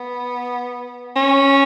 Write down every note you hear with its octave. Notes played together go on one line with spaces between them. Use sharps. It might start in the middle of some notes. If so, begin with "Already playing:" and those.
Already playing: B3
C#4